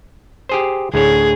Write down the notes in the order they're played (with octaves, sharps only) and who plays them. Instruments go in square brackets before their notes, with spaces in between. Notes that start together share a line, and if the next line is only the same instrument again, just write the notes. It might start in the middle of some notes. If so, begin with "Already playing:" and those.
[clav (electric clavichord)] G4 G#4 C5
[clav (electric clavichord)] D2 A2 C#5 [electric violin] G#4